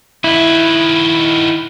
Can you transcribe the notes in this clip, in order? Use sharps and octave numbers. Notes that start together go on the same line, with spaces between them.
D#3 E4 F#4